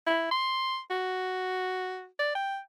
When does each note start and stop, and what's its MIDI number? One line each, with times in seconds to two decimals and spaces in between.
0.07 0.27 64
0.31 0.80 84
0.91 2.06 66
2.19 2.31 74
2.35 2.59 79